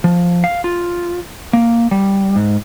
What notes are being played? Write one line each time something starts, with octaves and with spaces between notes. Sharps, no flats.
F3
F5
F4
A#3
G3
G#2